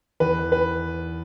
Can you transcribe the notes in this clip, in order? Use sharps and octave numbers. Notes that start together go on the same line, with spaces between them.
E2 B4
B4